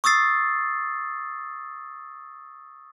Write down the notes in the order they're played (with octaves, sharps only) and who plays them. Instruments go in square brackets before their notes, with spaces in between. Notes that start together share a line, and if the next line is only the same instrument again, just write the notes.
[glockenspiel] C#6 D#6 E6 A6 C7